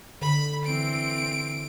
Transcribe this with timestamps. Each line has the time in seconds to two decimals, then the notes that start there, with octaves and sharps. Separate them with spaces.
0.22 D3 B5
0.66 E3 C4 D7